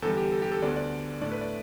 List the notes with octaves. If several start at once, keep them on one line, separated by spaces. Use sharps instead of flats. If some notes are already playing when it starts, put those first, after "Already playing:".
E2 D3 G3 A4
G4
A4
G4
A4
D2 D3 B3 D4 D5
D5
A2 A3 D4 D5
B4
D5